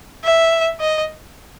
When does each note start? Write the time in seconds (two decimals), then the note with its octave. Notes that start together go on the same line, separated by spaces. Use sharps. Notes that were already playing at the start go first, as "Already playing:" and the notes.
0.24 E5
0.80 D#5